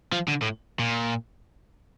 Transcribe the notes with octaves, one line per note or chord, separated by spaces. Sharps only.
F3
D3
A2
A#2